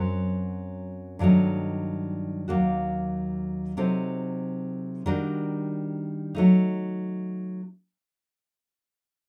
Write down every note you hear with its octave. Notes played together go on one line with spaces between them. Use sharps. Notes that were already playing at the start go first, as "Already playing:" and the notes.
Already playing: F#2 F#3 C4
G2 D#3 F#3 A3 D#4
D#2 D#3 F#3 A#3 F#4
C3 F#3 C4 D#4 A4
D#3 G3 D4 F#4 A#4
F#3 A3 D#4